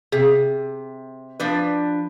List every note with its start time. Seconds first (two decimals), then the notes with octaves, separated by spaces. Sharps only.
0.12 C3 G#4
1.40 F3 D4 B4